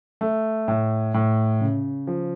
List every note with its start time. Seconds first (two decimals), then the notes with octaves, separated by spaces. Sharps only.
0.21 A3
0.68 A2
1.14 A2
1.61 C#3
2.07 F3